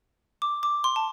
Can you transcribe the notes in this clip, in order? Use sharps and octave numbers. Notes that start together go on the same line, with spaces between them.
D6
D6
C6
A5